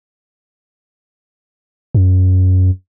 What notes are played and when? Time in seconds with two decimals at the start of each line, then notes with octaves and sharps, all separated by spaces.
1.95 F#2